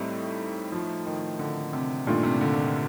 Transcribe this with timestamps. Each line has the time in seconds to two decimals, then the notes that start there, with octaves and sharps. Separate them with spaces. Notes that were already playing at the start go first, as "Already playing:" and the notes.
Already playing: A2 G3 A3 C4 D#4
0.72 F3
1.06 D#3
1.39 D3
1.73 C3
2.07 G2 A#2 D#3 A3 D4 F4
2.23 C3
2.41 D3